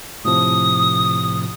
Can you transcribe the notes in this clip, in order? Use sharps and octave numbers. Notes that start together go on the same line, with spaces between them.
A2 C3 F3 D#6